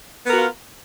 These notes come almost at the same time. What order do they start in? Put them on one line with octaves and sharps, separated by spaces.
B3 A#4 F#4 F4